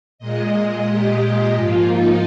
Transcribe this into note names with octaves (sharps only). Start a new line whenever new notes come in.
A#2 G#3 D#5
G4
G#2 F3 A#3 F4
D#4